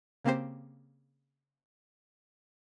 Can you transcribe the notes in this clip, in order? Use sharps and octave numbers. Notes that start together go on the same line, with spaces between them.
C#3 A#3 C4 G4 C5